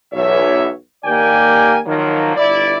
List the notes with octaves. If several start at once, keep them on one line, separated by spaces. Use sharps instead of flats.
B1 E2 C#5 E5
D#2 A#3 G4 D5 G5 G#5
D#3 F3 F#3 A#3
G1 E4 D5